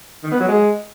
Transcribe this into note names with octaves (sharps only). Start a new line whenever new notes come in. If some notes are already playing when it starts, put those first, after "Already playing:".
D#3
B3
F#3
G#3